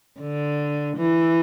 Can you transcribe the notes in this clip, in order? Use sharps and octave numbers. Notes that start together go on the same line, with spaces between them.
D3
E3